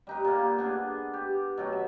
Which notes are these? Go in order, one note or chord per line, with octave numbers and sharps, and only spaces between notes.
G3 D#4 B4
A#2 A#3
B3 D4 G#4
G4
B2 F#3 G5
E5